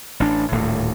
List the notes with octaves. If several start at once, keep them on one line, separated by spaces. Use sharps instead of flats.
A1 D4
D#1 D2 A2